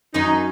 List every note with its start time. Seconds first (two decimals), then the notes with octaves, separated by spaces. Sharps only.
0.14 F#2 F#3 C#4 D#4